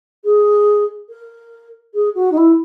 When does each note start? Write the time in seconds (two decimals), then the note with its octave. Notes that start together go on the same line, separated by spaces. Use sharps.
0.24 G#4
1.09 A#4
1.94 G#4
2.15 F#4
2.32 D#4
2.37 E4